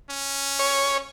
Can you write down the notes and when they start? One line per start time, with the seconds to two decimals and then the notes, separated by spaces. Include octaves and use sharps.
0.10 C#4
0.59 C#5